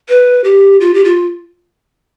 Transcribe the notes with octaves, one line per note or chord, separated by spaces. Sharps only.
B4
G4
F4
G4
F4